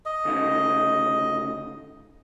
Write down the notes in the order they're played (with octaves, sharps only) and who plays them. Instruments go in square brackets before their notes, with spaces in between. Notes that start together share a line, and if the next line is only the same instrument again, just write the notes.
[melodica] D#5
[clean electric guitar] D2 C#3 D#4